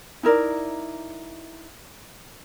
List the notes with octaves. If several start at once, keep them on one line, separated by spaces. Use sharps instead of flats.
D#4 E4 A#4 D5